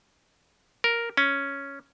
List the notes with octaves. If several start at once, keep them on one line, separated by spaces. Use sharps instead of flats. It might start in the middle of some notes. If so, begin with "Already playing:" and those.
A#4
C#4